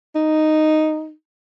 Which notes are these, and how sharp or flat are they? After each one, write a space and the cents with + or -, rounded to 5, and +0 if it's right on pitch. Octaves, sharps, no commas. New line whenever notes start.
D#4 -5